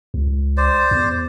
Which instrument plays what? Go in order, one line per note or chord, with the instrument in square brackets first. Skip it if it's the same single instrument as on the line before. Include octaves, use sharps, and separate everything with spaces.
[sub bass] C#2
[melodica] C5 D5
[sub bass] E2